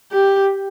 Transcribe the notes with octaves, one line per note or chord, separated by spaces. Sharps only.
G4